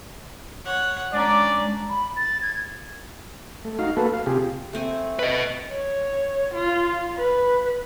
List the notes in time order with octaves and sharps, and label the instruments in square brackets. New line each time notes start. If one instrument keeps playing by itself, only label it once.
[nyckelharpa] C#5 F#5
[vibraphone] G#3 A#5 [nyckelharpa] C#4 D4 [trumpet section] D5
[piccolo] B5
A6
G#6
[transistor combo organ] A3
D#4 F#4 F5
A3 A#3 F#4 A4 B4
F5
C3 F4 G4 G#4
[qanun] A3 C4 G#5
[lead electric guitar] B4 D#5
[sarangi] C#5
F4
B4